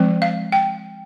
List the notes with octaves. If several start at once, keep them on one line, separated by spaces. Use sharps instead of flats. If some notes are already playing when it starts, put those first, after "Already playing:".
Already playing: F3 G#3 C4
F5
G5